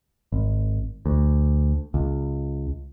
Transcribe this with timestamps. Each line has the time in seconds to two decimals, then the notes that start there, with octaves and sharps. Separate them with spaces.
0.32 G#1
1.06 D2
1.94 C#2